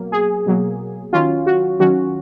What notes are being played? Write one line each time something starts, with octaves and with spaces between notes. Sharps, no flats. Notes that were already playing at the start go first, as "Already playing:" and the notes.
Already playing: B2 F#3 A#3
G#4
B2 F#3 A#3
D#3 F#3 C#4 F4
F#4
D#3 F#3 C#4 F#4